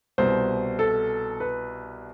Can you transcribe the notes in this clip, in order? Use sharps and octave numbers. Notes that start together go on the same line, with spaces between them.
C2 B2 C5
A4
B4